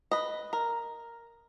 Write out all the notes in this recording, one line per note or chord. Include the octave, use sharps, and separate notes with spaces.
B4 D#5
A#4